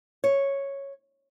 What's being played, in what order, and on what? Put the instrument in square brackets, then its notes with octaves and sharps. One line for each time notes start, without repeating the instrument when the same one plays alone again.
[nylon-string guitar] C#5